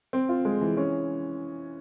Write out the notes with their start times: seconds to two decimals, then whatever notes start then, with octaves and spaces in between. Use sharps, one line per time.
0.13 C4
0.29 F4
0.45 G#3
0.61 E3
0.77 C#4